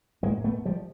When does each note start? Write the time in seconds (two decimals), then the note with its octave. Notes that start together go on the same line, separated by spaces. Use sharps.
0.23 A2 G#3 A#3
0.44 A3 B3
0.65 F3 G3